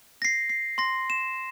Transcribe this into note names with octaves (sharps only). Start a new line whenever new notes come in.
A#6 C7
C7
C6 A#6
E7